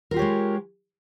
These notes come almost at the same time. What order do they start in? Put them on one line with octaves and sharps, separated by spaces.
A#4 F4 G4 C#5 G#3